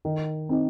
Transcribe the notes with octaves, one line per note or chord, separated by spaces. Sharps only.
D#3
C4 D#4